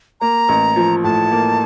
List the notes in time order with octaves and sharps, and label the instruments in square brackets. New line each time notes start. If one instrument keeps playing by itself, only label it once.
[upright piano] A#3 [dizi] A#5
[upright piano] A1
F3
[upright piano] A2 [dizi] A5
[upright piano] A#3